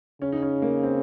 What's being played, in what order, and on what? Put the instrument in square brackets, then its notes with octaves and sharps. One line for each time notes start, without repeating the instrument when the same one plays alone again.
[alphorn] C#3 [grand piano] C#4
[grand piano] D#4
C#4
A#3
C4